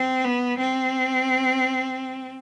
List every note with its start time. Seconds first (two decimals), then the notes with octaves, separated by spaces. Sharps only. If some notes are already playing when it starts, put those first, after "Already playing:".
Already playing: C4
0.24 B3
0.58 C4